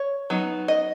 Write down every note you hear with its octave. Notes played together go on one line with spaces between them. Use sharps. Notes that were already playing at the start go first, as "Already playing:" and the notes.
Already playing: C#5
F#3 B3 D#4
D#5